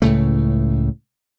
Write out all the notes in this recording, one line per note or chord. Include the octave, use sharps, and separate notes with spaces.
C#2 A2 C#3 A3